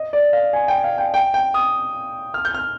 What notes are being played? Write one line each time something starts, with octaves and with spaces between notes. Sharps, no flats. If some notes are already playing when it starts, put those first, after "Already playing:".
Already playing: D#5
D5
F5
G#5
G5
F5
G5
G5
G5
D#6
F6
G6
F6